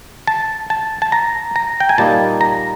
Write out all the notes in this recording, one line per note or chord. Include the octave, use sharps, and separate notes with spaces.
A5
A5
A5
A#5
A#5
G5
G#5
A#2 G3 A#3 D#4 A5
A#5